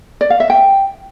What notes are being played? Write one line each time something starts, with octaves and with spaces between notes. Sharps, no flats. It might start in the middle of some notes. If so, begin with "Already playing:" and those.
D5
F5
E5
G5